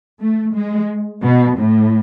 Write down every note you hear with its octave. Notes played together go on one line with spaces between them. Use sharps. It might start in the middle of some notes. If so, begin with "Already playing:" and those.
A3
G#3
B2
A2